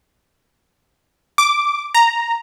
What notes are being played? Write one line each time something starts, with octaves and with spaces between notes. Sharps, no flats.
D6
A#5